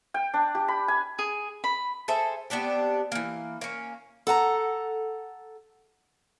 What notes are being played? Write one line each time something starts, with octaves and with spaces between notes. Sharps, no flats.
G5
D4
G4
B5
G#5
G#4
B5
G#4 A4 C5 E5
B3 C4 D4 G4
E3 A#3
A#3 C#4
A4 F#5 A5 A#5